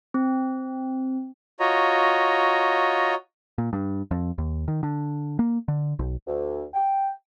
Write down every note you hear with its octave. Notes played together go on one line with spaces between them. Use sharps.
C4
F4 F#4 C#5 D#5 A#5
A#2
G2
F2
D#2
D#3
D3
A#3
D3
B1
D2
G5